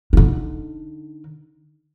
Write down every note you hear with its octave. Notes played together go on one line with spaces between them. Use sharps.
D3 D#4